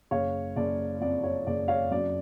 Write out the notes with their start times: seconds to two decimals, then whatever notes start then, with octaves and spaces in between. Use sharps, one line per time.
0.11 F#1 C#5 F5
0.56 F#1 D5
1.01 F2 D5
1.24 C#5
1.47 F#1 D5
1.68 C#5 F5
1.91 F#2 D5